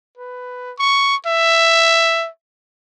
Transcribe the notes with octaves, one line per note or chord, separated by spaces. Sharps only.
B4
C#6
E5